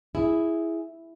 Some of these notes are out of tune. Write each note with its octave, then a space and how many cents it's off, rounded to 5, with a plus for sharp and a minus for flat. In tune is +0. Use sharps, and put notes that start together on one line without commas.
E4 +0 G#4 +0